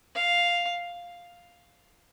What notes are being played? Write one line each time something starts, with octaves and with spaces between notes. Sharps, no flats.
F5